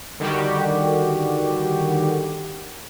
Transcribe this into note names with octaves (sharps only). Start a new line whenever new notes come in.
D3 D#3 G3 F#4 G4